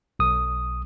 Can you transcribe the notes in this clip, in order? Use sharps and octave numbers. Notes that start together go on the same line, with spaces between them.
B1 D#6